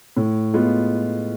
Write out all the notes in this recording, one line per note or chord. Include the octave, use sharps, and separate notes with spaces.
A2
G#3 B3 F4